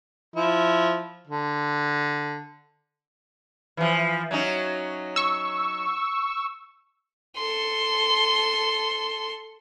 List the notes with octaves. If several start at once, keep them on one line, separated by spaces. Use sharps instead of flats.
F3 E4
D3
E3 F3
F#3 C#4 D#4
C#6 E6
A4 C6